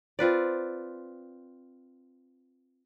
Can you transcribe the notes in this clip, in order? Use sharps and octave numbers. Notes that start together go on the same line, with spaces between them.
C4 F4 B4 D5